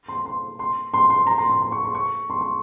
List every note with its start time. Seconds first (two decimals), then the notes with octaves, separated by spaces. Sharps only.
0.08 C6
0.25 C6
0.59 C6
0.94 C6
1.10 C6
1.27 A#5
1.38 C6
1.49 C6
1.62 C6
1.72 C#6
1.84 C6
1.95 C#6
2.30 C6
2.41 C6